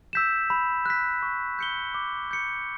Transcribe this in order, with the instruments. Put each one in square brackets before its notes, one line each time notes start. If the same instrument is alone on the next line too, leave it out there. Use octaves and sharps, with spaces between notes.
[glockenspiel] E6 G6 B6 E7
B5
F#6 B6
C#6
G6 C#7 G7
D6
G6 C#7